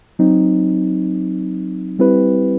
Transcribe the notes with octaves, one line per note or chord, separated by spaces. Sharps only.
F#3 C4 D#4
G3 C4 E4 G4 B4